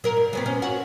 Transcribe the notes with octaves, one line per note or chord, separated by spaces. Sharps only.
F#3 A#4
G2
F#3 B3 C4
C#4
F#4